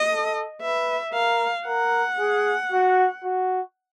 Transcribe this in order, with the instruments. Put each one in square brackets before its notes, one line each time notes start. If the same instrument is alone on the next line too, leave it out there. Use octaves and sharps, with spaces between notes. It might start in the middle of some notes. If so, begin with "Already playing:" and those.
Already playing: [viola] D#5
[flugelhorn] A4
[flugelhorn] B4 [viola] E5
[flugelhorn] A#4 [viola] F5
[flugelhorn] A#4 [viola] F#5
[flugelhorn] G#4
F#4
F#4